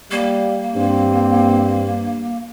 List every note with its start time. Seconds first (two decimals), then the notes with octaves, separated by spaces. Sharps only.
0.11 G3 A#3
0.75 G2 C4